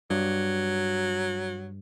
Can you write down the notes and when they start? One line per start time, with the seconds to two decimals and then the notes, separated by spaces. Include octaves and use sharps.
0.10 G2 F#3